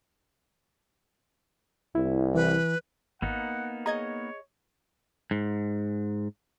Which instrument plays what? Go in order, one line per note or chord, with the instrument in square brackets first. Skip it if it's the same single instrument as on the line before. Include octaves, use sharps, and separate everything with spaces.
[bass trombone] C2 [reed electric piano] E4
[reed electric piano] E3 [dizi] B4
[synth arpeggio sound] G#1 [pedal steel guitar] A#3 B3 D#4 [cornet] F#5
[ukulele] G#4 D#5 [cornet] C#5 [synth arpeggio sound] A#5 G#6
[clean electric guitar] G#2